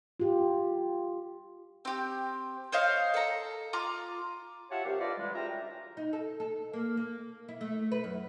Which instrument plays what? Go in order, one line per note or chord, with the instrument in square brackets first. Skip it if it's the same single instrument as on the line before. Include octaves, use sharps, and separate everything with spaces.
[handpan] F4 G4
[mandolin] C4 G4
C5 C#5 D#5 F5
A4 A#5
F4 A#5 D6
[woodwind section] F4 G4 C#5 E5 F#5 A5
C2 G4 F5
D4 F4 B4 D5 D#5
D3 E3 G3 G#3
C#2 F4 F#4 E5 G5 A#5
[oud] D#4
A4
A4
A#3
A#3
E4
A3
B4
F#2